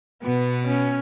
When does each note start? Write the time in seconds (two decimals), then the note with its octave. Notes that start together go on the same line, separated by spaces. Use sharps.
0.23 B2 B3
0.67 C#4